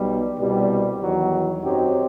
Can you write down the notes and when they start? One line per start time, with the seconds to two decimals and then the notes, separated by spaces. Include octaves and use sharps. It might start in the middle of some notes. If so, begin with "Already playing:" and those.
Already playing: B1 B2 G3
0.39 C2 B2 G3
1.01 E2 D#3 F#3
1.63 F#2 F#3 C4 D#4 G4